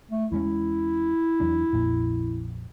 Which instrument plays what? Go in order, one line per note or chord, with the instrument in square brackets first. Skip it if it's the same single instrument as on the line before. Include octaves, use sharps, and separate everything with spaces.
[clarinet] A3
[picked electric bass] E2 G#3 C#4 [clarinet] E4
[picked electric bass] E2 F#3 D4
A#1 F2 A#2